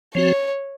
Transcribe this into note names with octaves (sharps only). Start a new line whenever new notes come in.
F3 C4 F#4 C#5